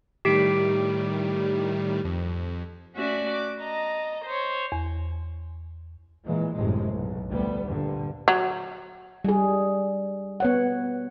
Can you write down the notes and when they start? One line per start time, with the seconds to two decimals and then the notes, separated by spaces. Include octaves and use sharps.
0.25 A2 D#3 G3 G4 B6 D7
2.05 F2
2.95 A3 C#4 F#4 D5 E5
3.30 D6
3.61 D#5 A5 A#5
4.24 C5 C#5
4.72 E2
6.24 A#2 E3 G#3
6.55 G1 F#2 A2 C3 G#3
6.92 B1
7.29 D2 G3 B3
7.67 D2 G2 A#2 D3
8.28 F#3
9.25 G3 G#4
10.40 B3 C#5 F#5